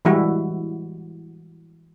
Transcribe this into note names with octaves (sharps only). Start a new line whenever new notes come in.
E3 G3 G#3 E4 F#4